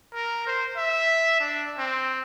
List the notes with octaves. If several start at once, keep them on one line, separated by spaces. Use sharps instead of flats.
A#4
C5
E5
D4
C4